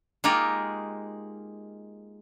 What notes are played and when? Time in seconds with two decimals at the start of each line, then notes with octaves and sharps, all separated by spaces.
0.24 G#3 A#3 D#4 F4 G4 A#4